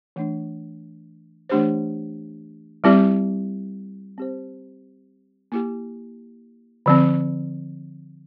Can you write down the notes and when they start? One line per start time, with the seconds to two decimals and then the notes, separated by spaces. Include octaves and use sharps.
0.16 E3 A3 D4
1.49 E3 A3 D4 G4 C5
2.84 G3 C4 E4 G4 D5
4.18 C4 G4 C5
5.52 A#3 E4 G4
6.86 D3 F3 C4